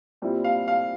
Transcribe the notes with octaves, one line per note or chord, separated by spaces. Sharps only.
A#2 G3 C4 E4
F5
F5